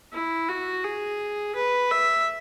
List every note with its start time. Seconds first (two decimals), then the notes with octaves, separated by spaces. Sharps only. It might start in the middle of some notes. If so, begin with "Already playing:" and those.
0.13 E4
0.49 F#4
0.84 G#4
1.55 B4
1.91 E5